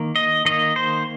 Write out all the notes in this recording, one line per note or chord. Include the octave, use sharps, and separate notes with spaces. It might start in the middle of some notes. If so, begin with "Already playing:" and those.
Already playing: D#3 A#3
D#5
D#3 A#3 D#5
C5